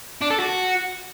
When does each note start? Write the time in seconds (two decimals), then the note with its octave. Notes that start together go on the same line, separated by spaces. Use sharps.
0.21 D4
0.30 A4
0.40 F#4